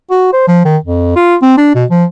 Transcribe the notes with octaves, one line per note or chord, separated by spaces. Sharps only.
F#4
C5
F3
D#3
F2
F4
C4
D4
B2
F3